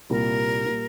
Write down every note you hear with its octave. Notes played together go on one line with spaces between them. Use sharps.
C2 A#2 G3 A#3 F4 A#4
A#2 G3 A#3 F4